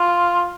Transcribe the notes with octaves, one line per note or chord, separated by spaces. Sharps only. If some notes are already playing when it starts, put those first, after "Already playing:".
Already playing: F4